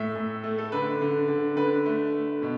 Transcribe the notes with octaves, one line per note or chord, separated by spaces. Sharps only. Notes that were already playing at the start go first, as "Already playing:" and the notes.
Already playing: A2 E5
A2
A3
A4
D3 B4
D3
D3
D3 B4
A3
A3
B2